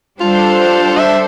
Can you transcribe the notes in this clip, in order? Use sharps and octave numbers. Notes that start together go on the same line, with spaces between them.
G3 D4 F4 A4 C5
E5